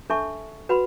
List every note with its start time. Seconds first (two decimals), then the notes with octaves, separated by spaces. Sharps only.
0.10 D4 A4 E5 A5 C#6
0.69 F#4 B4 F#5 B5